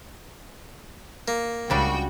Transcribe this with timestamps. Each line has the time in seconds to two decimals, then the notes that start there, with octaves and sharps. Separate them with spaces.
1.28 A#3
1.70 C#2 C#3 G3 D4 F#4 G5